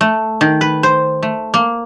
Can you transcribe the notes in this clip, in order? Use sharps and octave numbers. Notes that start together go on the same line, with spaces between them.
A3
D#3
B4
C5
A3
A#3